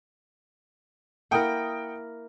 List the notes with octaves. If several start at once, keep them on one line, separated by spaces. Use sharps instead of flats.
A#3 E4 A#4 F#5 G5 D#6